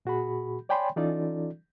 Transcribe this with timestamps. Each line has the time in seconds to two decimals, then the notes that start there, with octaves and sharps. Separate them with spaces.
0.05 A#2 F#4 G#4 B5
0.69 C#5 D5 G5 G#5 B5 C6
0.96 E3 C#4 D#4 F4 A4 D5